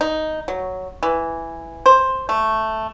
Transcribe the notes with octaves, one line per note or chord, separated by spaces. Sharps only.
D#4
F#3
E3
C5
A3